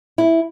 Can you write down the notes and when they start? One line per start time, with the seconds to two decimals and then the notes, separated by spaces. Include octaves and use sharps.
0.18 E4